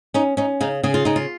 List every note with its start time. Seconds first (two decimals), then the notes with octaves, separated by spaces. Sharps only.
0.14 C#4 D#4
0.37 C#4 D#4
0.61 C#3 D#4
0.83 C#3 G#4
0.94 F4
1.05 C#3 D#4
1.16 F4